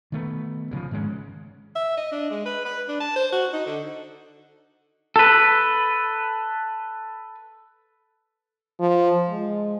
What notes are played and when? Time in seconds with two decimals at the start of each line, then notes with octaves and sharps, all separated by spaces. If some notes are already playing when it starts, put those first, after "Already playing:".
0.12 D#3 A3 B3
0.71 D2 C#3 F3
0.91 G#2 D#3 G#3 C#4
1.76 E5
1.98 D#5
2.12 D4
2.31 G#3
2.46 B4
2.66 B4
2.88 D4
3.01 A5
3.16 C5
3.33 F#4
3.54 D#4
3.66 D3
5.16 A4 B4
8.80 F3
9.28 G#3